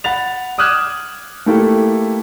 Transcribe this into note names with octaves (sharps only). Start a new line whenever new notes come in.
F#5 B5 A6 F7
D6 D#6 F6 F#6 G#6 E7
A3 A#3 E4 G4 A4